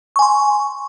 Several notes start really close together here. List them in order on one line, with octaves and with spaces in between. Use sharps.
C#6 G#5 C6